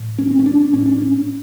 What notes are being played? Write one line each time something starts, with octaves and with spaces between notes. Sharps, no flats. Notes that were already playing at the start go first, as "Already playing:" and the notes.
Already playing: A2
C#4
C4
C#4
D4
A2 C#4
D4
C#4